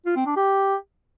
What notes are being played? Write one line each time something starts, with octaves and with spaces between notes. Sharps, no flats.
F4
C4
D4
G4